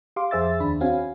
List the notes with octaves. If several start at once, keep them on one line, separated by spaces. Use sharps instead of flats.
G4 F5 C6 D6
F2 G#4 C5 E5 E6 A6
D#2 D4 B5
C4 C#4 F#4 F5 G#5